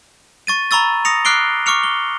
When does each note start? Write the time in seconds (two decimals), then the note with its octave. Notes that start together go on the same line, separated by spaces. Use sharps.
0.47 C#6 A6 D#7
0.71 A#5 B5 C#6 E6 A6
1.05 D#6 A#6 C#7 F7
1.25 D6 F6 F#6 C7 D7 G7
1.66 C#6 D6 F6 C#7 F7
1.83 G7